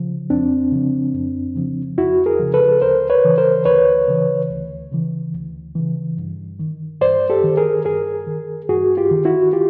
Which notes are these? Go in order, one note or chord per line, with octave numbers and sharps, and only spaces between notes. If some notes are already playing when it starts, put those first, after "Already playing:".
Already playing: C#3 F3
F2 C4 D4
C#3 F3
F2
C#3 F3
F2 E4 F#4
G#4 A#4
C#3 F3
A4 B4
D2 A#4 C5
B4 C#5
C#3 E3
A#4 C5
D2 B4 C#5
C#3 E3
D2
C#3 E3
D2
C#3 E3
G2
D#3
G2 C5 D5
G4 A4
D#3
G#4 A#4
G2 G#4 A#4
D#3
G2 F#4 G#4
F4 G4
D#3
E4 F#4
F4 G4